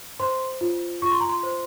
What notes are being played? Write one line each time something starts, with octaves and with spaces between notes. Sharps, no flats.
C5 C6
F4
F4 C#6
C6
A#5
C6
C5